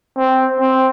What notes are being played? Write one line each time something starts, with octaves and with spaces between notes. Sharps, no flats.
C4
C4